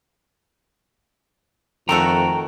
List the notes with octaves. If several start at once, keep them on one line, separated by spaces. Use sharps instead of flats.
F2 D#3 A3 F#4 G5 A#5